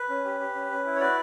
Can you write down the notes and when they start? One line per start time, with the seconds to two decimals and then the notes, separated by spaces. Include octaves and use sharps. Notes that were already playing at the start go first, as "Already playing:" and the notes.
Already playing: B4
0.09 C#4
0.25 G4
0.40 G4
0.55 C#4
0.70 C#4
0.85 E4
0.95 C#5
1.00 F#4 B4 D5